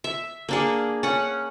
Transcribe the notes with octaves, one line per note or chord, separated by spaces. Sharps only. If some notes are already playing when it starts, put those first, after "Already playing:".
E5
A#3 D4 G#4
C#4 F#5